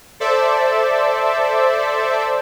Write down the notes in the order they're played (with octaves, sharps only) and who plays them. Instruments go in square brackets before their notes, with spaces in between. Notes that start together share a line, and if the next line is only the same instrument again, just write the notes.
[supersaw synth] A4 C5 D5 E5